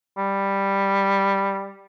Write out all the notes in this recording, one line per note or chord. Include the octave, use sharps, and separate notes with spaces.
G3